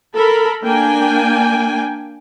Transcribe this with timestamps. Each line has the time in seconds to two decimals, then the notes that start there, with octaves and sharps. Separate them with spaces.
0.14 A4 A#4 B5
0.63 A#3 D4 G5 G#5